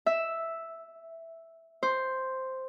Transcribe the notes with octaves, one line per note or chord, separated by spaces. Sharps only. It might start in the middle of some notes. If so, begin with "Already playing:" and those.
E5
C5